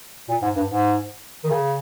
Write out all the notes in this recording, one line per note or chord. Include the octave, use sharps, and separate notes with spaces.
A#2
G#2
G2
G#2
D#3
C#3